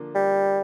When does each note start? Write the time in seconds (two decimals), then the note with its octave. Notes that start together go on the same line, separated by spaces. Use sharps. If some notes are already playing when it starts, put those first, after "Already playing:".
Already playing: D3 F3 A#3 D4
0.15 G3